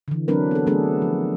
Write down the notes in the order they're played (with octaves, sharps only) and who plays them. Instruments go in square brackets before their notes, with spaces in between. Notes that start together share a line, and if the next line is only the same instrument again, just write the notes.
[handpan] D3 E3
F#3 C4 D4 A#4 B4
B3 A4
F#3 A3 B3 D4 G#4 A4
F3